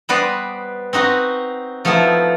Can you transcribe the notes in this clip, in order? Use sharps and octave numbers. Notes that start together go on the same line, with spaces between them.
G3 B3 B4 C5 D5 D#5
C4 D#4 F#4 B4
F3 A3 B3 D#4 E4